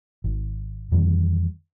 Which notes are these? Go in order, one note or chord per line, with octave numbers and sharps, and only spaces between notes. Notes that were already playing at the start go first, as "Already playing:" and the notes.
G#1
F2 D#3 E3 G3